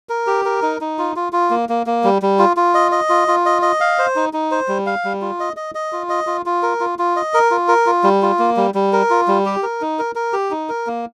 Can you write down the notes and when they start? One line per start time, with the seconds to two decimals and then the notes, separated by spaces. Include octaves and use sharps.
0.09 A#4
0.27 G4
0.45 A#4
0.62 D#4
0.81 D#4
0.99 F4
1.16 F4
1.33 F4
1.50 A#3
1.69 A#3
1.87 A#3
2.04 G3
2.22 G3
2.39 F4
2.57 F4
2.74 D#5
2.92 D#5
3.09 F4
3.28 F4
3.46 D#5
3.62 D#5
3.80 F5
3.99 C5
4.16 D#4
4.33 D#4
4.51 C5
4.68 G3
4.86 F5
5.04 G3
5.21 F4
5.40 D#5
5.57 D#5
5.75 D#5
5.92 F4
6.09 D#5
6.27 F4
6.46 F4
6.63 A#4
6.80 F4
6.99 F4
7.16 D#5
7.34 A#4
7.51 F4
7.68 A#4
7.86 F4
8.03 G3
8.22 F4
8.39 A#3
8.57 G3
8.74 G3
8.93 A#4
9.10 F4
9.28 G3
9.46 G4
9.63 A#4
9.81 D#4
9.99 A#4
10.15 A#4
10.33 G4
10.51 D#4
10.69 A#4
10.87 A#3